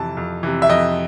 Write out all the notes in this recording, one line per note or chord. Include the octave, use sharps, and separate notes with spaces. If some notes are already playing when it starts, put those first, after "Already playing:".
Already playing: F2 C3 E3 A5
F2
C3 E3
E5
F2 D#5